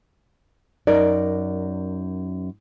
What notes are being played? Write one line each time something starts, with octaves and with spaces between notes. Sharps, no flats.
F#2 D#4 A#4 D5